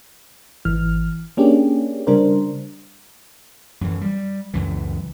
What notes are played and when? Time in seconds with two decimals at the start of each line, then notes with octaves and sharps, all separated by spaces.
0.65 G#1 E3 F6
1.37 A#3 C#4 D4 G4 G#4
2.07 C#3 G3 D4 A#4 C5
3.81 F#2 E3
4.01 G3
4.54 C#2 F#2 E3